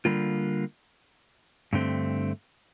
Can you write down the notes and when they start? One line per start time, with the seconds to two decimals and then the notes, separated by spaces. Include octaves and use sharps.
0.05 D3 G3 A#3 F4
1.73 G2 D3 A3 C4